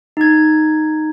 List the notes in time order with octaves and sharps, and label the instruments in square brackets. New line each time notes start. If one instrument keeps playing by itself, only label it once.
[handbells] D#4 G#6